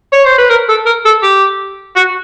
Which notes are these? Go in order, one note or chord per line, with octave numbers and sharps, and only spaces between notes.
C#5
C5
B4
A#4
A4
A#4
A4
G4
F#4